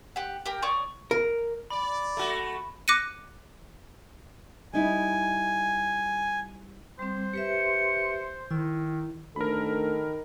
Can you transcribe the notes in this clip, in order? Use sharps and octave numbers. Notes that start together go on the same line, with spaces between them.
G4 F#5
G4 A#4 G5
C#5 D5 C#6 D#6
A#4
D5 B5
A3 F#4
D6 F#6 A#6 C#7 D#7
G3 D#4 E4 G#5
G3 C4 C5
G4 B4 E5 C#7
D#3 E4
D2 D#3 A4 A#4 B5